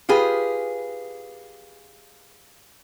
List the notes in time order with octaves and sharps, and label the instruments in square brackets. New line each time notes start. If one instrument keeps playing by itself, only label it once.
[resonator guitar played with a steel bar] F4 G4 G#4 B4